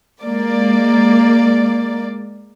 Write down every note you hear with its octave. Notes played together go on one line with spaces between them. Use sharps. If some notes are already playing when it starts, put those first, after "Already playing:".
G#3 A#3 D5